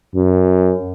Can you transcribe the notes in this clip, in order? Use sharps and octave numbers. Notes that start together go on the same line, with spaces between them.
F#2